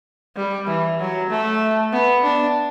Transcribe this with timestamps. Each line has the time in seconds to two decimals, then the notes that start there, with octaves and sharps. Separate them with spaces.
0.36 G3
0.67 E3
0.99 F#3
1.30 A3
1.92 B3
2.23 D4